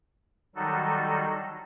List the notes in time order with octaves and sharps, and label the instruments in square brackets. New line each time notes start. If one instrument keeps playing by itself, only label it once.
[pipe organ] D#3 F#3 G3 D#4 F#4 A4